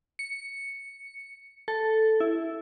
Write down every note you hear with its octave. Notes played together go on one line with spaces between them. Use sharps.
C#7
A4
E4